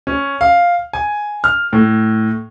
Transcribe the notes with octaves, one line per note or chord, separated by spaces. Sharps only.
C#4
F5
G#5
F6
A2